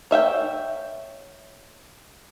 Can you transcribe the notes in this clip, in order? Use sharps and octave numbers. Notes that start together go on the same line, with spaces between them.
C#5 E5 F5 G5